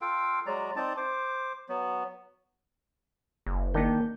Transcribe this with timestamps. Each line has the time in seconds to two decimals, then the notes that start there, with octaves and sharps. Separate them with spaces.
0.01 F4 A4 F5 G5
0.46 F#3 G#3 D5 A#5
0.76 C4 D#4 D5 A5
0.97 C5 D6
1.69 F#3 B3
3.46 F#1
3.74 D#3 A#3 D4 G6